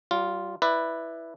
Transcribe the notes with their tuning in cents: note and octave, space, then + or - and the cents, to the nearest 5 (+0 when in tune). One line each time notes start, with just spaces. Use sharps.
G3 -40 F4 +0
E4 +0 B4 +0 D5 +20